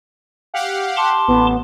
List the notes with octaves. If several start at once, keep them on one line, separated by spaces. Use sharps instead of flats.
G4 F5 F#5
A5 C6 D6
A1 B3